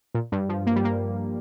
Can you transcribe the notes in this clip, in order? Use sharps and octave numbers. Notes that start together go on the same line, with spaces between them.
A#2
G2
F3
A#3
G3
A#3